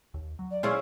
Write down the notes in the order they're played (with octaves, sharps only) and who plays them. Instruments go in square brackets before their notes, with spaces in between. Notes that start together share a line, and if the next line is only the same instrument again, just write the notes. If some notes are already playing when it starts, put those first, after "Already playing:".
[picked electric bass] D#2
F#3
[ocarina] D5
[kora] C#4 E4 F4 [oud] G#4 C5